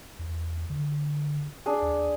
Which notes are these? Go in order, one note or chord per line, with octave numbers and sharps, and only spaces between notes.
E2
D3
D4 G#4
D#2